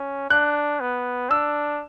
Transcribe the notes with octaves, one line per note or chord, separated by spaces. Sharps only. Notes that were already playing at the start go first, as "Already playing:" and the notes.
Already playing: C#4
D4 F#6
B3
D4 E6